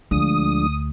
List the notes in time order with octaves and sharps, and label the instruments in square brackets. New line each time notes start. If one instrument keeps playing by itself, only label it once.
[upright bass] D2 [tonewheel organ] F3 G#3 D4 [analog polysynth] D#6